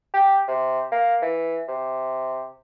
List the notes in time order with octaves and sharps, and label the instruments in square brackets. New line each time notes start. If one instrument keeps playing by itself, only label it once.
[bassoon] G4
C3
A#3
E3
C3